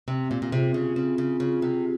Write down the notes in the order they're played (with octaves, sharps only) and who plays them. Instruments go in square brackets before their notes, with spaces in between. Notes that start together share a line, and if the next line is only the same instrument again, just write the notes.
[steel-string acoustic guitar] C3 [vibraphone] C4
[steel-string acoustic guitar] A#2
A#2
[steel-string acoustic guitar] C3 [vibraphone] F4 G#4
[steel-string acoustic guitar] C#3
[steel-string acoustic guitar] C#3 [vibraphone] C4
[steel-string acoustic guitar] C#3
[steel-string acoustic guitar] C#3 [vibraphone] F4 G#4
[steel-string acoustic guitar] C3